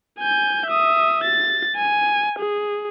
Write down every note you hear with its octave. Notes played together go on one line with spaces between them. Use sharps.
G#5 G6
E5 D#6
A6
G#5
G#4